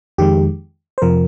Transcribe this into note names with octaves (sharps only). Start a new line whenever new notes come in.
F2 D#3 G#3 G4
C5
F2 C3 F3 A#4